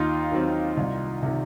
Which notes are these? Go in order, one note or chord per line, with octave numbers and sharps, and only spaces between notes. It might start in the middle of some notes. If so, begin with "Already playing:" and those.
Already playing: D#2 D#4 F4
D#3 F#3 C4
C2
C3 D#3